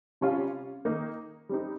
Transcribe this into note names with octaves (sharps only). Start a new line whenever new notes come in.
C3 G3 C#4 F4
D#3 A#3 D#4
G3 C4 D#4